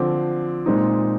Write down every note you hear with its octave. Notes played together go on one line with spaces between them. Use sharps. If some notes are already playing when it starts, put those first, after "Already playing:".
Already playing: D3 F3 C4 D6
A#2 G#3 C4 D#4